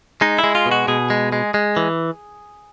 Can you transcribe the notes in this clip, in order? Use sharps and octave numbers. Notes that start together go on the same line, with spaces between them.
G#3 D#4
E4
G#3
F4
B2
F#4
B2 G#4
G#3
G#3
G#3
E3